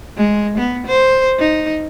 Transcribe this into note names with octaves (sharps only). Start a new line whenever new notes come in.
G#3
B3
C5
D#4